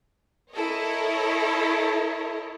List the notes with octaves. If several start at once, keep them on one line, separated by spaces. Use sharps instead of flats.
E4 A4 A#4 C#5 D#5